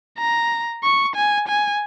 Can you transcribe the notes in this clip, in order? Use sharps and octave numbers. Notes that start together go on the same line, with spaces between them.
A#5
C#6
G#5
G#5